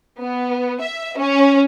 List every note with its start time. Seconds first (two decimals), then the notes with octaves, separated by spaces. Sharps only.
0.21 B3
0.81 E5
1.17 C#4